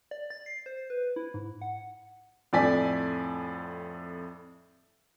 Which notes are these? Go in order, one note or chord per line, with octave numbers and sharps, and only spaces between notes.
D5
A6
C7
C5
B4
E4
G#2
F#5
F2 A2 D5 G#5 B6